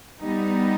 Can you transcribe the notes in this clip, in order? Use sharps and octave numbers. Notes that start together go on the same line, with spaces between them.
G3 B3 D#4